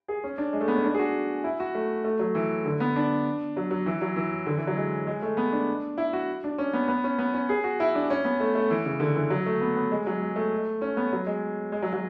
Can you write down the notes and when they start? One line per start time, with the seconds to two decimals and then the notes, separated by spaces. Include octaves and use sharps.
0.08 G#4
0.24 C#4
0.38 D4
0.53 G#3
0.61 A3
0.68 B3
0.76 C#4
0.84 D4
0.94 G#4
0.99 F#4
1.44 E4
1.60 F#4
1.75 A3
2.04 A3
2.19 F#3
2.35 E3
2.65 D3
2.80 B3
2.96 D4
3.57 F#3
3.71 F#3
3.86 E3
4.01 F#3
4.16 E3
4.46 D3
4.57 E3
4.67 F#3
4.77 G#3
5.07 G#3
5.22 A3
5.37 B3
5.52 D4
5.98 E4
6.13 F#4
6.44 D4
6.58 C#4
6.73 B3
6.88 B3
7.04 C#4
7.19 B3
7.34 C#4
7.49 G#4
7.64 F#4
7.80 E4
7.95 D4
8.10 C#4
8.25 B3
8.40 A3
8.55 A3
8.70 E3
8.85 C#3
9.00 D3
9.16 E3
9.30 F#3
9.46 A3
9.61 B3
9.76 B3
9.91 G#3
10.06 F#3
10.21 G#3
10.36 A3
10.81 C#4
10.97 B3
11.12 F#3
11.27 G#3
11.72 G#3
11.82 F#3
11.92 F#3